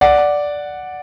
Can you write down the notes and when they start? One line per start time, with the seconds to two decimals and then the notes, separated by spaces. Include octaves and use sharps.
0.01 D5 F#5